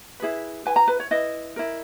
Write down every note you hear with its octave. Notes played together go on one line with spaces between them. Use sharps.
E4 G#4 B4
E4 B4 G#5
A#5
B4
C#5
E4 B4 D#5
E4 A#4